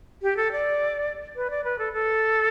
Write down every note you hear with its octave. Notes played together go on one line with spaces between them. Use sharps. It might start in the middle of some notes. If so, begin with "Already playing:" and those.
G4
A4
D5
B4
D5
B4
A4
A4